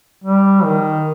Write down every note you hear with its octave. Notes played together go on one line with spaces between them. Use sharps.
G3
D#3